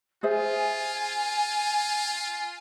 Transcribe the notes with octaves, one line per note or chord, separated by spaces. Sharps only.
F4 G#4 C5 E5 G#5